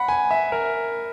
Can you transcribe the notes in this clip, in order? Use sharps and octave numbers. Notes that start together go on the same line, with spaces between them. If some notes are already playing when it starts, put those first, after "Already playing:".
Already playing: F#5 B5
G#5
E5
A#4